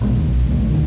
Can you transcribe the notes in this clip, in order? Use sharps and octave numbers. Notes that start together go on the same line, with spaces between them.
A#1 B2 G#3
D#2
B1
D2 A#3
A#1 A3
D2 D#3